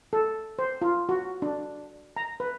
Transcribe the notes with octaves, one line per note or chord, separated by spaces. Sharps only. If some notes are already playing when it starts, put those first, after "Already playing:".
A4
C5
F4
F#4
D4
A#5
B4